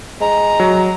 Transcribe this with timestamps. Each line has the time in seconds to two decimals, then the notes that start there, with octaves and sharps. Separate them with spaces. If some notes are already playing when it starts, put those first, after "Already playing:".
0.21 G#3 A#5
0.60 F#3